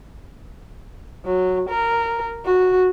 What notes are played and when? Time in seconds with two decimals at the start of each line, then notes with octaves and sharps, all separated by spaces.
1.25 F#3
1.70 A#4
2.45 F#4